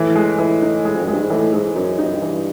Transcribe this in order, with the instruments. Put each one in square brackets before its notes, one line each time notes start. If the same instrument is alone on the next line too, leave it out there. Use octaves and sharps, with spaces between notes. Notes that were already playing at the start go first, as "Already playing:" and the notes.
Already playing: [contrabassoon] A2 [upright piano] E3
[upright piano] G#3
E3
D#4
G#3
[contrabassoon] F2
[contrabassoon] F#2 [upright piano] G#3
[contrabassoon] G2
G#2
[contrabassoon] A2 [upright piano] E3
[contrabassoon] G#2 [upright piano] G#3
[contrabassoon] F#2 [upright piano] D#4
[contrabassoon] G2 [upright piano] D#4
[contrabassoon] F#2
G2
[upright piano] E3